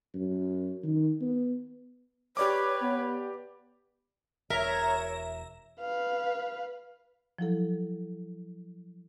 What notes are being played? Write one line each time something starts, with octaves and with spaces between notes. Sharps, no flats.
F#2
D#3
B3
G4 B4 C#5 D5 D6
B3
E1 A#4 C#5 E5 A#5
B4 F5
F3 F#3 E4 A4